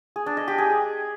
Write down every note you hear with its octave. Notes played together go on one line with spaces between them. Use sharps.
G#4
D4
D#5
G4
G#4